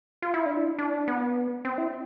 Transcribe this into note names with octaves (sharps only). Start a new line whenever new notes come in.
F4
E4
D4
E4
D4
B3
C4
E4